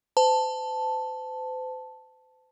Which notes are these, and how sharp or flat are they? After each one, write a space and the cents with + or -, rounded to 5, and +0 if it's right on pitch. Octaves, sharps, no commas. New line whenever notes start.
C5 -40 A5 +0